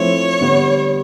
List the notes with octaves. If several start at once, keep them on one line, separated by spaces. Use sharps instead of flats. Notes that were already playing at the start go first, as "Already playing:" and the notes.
Already playing: F3 A3 C4 E4 C#5
D3 G3 B3